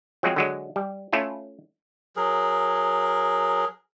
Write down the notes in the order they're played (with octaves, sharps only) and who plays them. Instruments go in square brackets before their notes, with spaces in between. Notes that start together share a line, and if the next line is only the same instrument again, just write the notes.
[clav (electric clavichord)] F3 F#3 G#3 C4
D3 F#3 G#3
G3
A3 C#4 E4 F4
[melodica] F#3 G#4 A#4